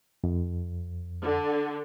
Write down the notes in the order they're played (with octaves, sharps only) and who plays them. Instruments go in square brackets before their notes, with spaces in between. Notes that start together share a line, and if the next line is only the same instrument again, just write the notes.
[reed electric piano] F2
[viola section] D3